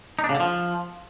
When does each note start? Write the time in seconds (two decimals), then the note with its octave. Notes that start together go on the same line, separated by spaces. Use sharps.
0.19 D#4
0.24 D4
0.29 C#3
0.35 D3
0.40 F3